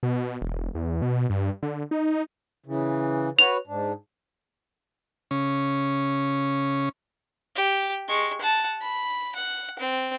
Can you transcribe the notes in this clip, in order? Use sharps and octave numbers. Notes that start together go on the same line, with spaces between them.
B2
E1
E2
B2
G2
D3
D#4
C#3 E3
F#4 B4 C#5 F7
G#2 D4
C#3 C#4
G4
G#3 C#6
F#5 A5
B5
F#5
C4